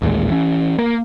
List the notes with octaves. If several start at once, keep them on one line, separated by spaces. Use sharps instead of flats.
A1 D#2 A#2 G#3
E3 C#4
A#3